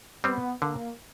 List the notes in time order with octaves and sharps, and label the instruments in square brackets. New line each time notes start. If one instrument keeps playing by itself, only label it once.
[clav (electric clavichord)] G3 C4 [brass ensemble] B3
[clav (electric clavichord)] D3 [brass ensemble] A#3